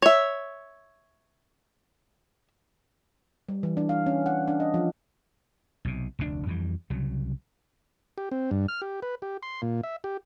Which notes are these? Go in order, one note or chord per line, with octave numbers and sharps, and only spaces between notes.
C#5 E5
G3
E3
D4
F5
C#4
F#5
D4
D#5
F3
B1 C3
F1 D2 A#2 D4
F2 E3 G3
C2 C#3 F#3
G4
C4
G2
F6
G4
B4
G4
C6
A#2
E5
G4